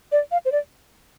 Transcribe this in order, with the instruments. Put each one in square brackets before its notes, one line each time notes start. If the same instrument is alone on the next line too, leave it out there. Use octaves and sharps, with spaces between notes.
[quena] D5
F5
C5
D5